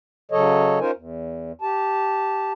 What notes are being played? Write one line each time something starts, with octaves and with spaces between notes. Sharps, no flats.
C#3 F#3 A4 C#5 D#5
C#4 D#4 F4 A#4 C5 G#5
E2
G4 A5